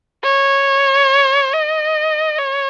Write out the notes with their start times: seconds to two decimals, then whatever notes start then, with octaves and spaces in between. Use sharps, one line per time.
0.24 C#5
1.53 D#5
2.38 C#5